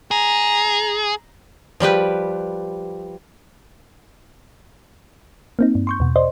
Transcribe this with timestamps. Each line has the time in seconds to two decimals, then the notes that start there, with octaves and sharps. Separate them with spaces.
0.11 G#4 A#5
1.80 F3 G3 G4 B4
5.59 A#3 C4 D#4
5.75 G2
5.87 C6 C#6 G6
6.00 E2 B2
6.16 C5 D5 D#5 C6